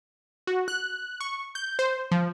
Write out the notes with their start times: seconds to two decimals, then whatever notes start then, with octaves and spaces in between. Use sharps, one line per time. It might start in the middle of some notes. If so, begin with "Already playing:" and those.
0.47 F#4
0.68 F#6
1.21 C#6
1.55 G6
1.79 C5
2.11 F3